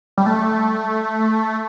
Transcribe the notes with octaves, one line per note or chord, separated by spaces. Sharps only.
G3
A3